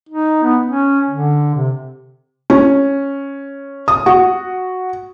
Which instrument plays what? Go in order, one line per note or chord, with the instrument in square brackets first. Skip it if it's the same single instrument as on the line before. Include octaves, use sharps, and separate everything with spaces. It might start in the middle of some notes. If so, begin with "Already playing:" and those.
[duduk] D#4
B3
C#4
D3
C3
[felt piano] C#4
D#6
F#4